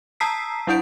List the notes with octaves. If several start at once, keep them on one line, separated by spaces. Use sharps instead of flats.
A5 A#5 D#6 E6 B6 C7
F#3 D4 E4 F#5 G6 D7